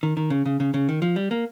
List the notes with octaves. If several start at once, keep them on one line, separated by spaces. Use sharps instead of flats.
D#3
D#3
C#3
C#3
C#3
C#3
D#3
F3
G3
A#3